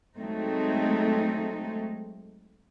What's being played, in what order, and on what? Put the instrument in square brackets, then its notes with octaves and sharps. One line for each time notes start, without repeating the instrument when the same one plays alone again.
[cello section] F#3 G#3 A3 C4 D#4